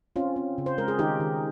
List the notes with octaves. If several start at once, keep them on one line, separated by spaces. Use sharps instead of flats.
C4 C#4 F4
C4
C#3
C5
G#3 A#4
G#4
D#3 D#4 G4
D#3